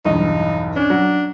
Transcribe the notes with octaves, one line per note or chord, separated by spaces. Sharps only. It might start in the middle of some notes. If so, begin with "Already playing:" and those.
B1 E2 G2 D#4
C#4 D4
F#3